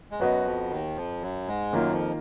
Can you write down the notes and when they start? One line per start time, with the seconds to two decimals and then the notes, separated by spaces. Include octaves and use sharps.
0.11 G#3
0.19 F#2 F#3 B3 F#4 B4 D#5
0.45 F2 F3
0.70 D#2 D#3
0.96 F2 F3
1.22 F#2 F#3
1.47 G#2 G#3
1.73 F#2 D#3 F#3 A#3 F4
1.92 F2 F3